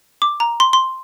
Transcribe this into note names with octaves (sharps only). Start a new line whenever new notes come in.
D6
A#5
C6
C6